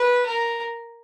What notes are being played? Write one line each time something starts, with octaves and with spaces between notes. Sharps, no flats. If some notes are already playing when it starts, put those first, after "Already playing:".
Already playing: B4
A#4